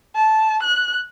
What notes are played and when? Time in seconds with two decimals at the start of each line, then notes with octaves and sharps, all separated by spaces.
0.15 A5
0.63 F#6